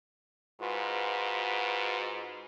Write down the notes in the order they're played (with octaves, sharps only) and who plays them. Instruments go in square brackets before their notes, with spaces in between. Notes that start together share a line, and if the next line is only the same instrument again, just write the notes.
[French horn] G#2 [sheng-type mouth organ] F4 F#4 B4